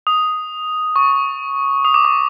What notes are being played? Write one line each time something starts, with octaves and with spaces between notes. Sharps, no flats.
D#6
C#6
D#6
D6
C#6